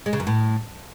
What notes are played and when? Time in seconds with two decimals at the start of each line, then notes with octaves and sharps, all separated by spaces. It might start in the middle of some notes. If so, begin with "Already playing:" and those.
0.06 G#3
0.13 C#3
0.20 F#2
0.27 A2